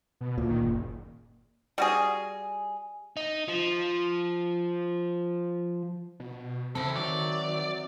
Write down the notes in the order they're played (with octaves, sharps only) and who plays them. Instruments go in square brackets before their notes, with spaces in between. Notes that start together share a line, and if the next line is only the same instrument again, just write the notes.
[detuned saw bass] B2
[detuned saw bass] D2 [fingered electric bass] A#2
[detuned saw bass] D#3
F#1
[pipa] G3 F#4 G#4
[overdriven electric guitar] D#4
F3
[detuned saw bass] B2
[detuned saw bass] C#3 [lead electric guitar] E3 A4 [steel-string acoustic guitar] C4 E5
[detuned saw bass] D#3 [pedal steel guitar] F#3 [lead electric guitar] D5